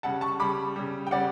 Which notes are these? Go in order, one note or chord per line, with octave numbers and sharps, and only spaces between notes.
C#3 G3 F#5 A5
A5 C#6
C#3 G3 B5 D6
C#3 G3
G5
C#3 G3 D5 F#5